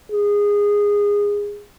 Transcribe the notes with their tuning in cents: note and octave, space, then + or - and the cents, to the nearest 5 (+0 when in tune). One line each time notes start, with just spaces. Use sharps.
G#4 -20